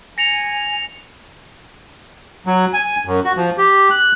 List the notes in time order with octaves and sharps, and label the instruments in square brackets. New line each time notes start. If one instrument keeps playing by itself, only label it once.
[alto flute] G#5 [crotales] A#6 C#7 F7
[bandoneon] F#3
G#5
F#2
F#4
F3
G4
F#6